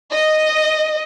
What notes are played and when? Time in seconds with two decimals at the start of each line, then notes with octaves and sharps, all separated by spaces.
0.13 D#5